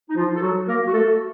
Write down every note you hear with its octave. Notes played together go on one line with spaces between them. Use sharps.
D#4
F3 F4
A4
F#3 F#4
A#3 A#4
F#4
A3 A4